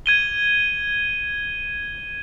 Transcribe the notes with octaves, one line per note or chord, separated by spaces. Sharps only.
G#6 D#7 G7